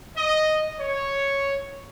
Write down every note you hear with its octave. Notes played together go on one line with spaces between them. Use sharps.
D#5
C#5